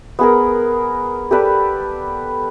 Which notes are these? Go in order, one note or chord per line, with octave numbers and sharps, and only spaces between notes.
B3 G#4 A#4
G4 A4 B4 D5